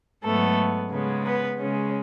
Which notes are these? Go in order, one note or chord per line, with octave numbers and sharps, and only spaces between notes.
G#2 F#3 A3 B3 A4
C#3 G#3 B3
B3 B4
C#3 G#3 C#4